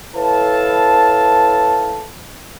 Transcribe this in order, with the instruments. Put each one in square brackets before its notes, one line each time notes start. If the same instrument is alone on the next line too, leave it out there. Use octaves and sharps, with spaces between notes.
[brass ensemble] E4 A4 B4 C#5 F5 A5